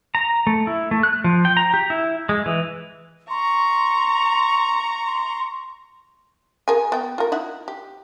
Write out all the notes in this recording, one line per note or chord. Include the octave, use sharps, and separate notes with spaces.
A#5
A3
E4
A3
F#6
F3
G5
A#5
G4
E4
G#3
E3
A#5 C6 C#6
C6
G#4 A#4 G#5
B3 G5
F4 A#4
D#4 E4 F#5
G4